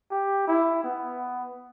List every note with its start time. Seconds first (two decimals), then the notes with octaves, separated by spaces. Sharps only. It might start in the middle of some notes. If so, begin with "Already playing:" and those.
0.11 G4
0.47 E4
0.84 B3